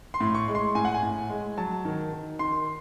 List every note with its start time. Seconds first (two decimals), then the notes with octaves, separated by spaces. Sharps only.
0.14 C6
0.21 A2
0.35 C#6
0.48 G#3
0.55 C6
0.75 A2 G#5
0.85 F#5
0.94 G#5
1.03 A2
1.30 G#3
1.57 F#3 A5
1.85 D#3
2.12 D#3
2.39 D#3 C6